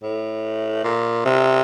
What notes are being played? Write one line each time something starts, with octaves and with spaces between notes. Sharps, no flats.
A2
A#2
C3